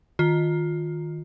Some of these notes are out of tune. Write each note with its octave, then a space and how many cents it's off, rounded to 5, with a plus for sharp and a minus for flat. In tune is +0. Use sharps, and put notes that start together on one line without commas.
D#3 +0 F4 +15